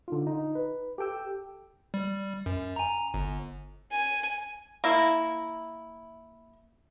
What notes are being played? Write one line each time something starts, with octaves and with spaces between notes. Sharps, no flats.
D3 D#4 F4
D#4
B4
G4 A4 G5 E6
G3
F#2
G#5 A#5
G1
G#5
A#3 E4